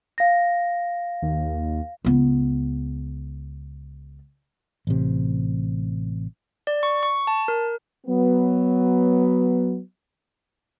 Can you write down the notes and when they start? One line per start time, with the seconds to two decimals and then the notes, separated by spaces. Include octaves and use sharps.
0.18 F5 A#6
1.22 D#2
2.05 C#2 B3
4.87 A1 C3
6.67 D5
6.83 C#6
7.03 C#6
7.27 A5
7.48 A#4
8.07 F#3 B3